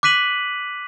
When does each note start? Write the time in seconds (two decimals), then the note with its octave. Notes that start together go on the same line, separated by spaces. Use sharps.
0.03 D6 F#6 B6 D#7 F#7